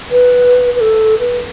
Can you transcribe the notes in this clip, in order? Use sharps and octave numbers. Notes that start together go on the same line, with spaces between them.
B4
B4
A4
B4